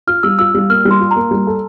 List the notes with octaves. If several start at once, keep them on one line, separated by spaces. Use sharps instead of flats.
F4 F6
G3 E6
F4 E6
G3
A#3 F6
G3
C6
F4
A#5
A#3
G3
A4